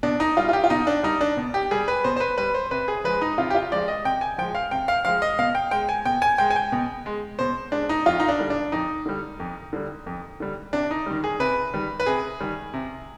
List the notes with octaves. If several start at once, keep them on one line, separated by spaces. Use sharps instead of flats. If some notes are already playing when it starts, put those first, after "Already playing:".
B2 D4
D#4
G3 F4
F4
G4
F4
B2 D#4
D4
G3 D#4
D4
B2
G4
G3 G#4
B4
B2 C5
C5
B4
G3 B4
C5
C3 B4
G#4
F3 G#3 B4
D#4
C3 F4
G4
F4
F3 G#3 D5
D#5
C3 G5
G#5
F3 G#3 G5
F5
C3 G5
F5
F3 G#3 F5
D#5
B2 F5
G5
G#3 G5
G#5
B2 G5
G#5
G#3 G5
G#5
G5
B2
G#3
B2 C5
G#3 D4
D#4
F2 F4
D#4
D4
D3 G3
D4
F2 D#4
D3 G3
F2
D3 G3
F2
D3 G3
C3 D4
D#4
D#3 G3
G#4
C3 B4
D#3 G3
B4
C3 G#4
D#3 G3
C3